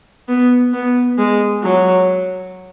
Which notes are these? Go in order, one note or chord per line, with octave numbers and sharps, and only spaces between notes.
B3
B3
G#3
F#3